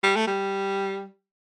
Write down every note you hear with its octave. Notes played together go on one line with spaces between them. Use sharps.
G3
A3
G3